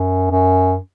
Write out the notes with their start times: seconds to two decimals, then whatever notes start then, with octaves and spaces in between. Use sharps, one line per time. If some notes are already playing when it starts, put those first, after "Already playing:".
Already playing: F#2
0.31 F#2